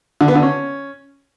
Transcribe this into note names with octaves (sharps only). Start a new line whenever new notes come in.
D3
B3
D3
C#4